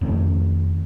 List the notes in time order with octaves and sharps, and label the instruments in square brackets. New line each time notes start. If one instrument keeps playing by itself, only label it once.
[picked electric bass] F2 D#3 A3 C#4